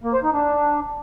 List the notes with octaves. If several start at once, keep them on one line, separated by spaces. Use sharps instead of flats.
A#3
C5
D#4
D4